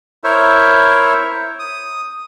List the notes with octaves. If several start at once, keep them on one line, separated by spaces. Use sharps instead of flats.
E4 A#4 C5 C#5 E5
D#6